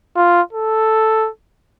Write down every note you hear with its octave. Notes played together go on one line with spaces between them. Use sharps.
F4
A4